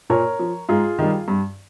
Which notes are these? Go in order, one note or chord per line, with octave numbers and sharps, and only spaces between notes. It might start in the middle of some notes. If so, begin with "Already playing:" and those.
A#2 A#4 C#5
F3
G#2 F4 G#4
D#3 G3
G2